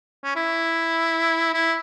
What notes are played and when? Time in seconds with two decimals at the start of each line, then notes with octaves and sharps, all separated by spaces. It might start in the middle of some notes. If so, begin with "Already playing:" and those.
0.24 C#4
0.36 E4
1.54 E4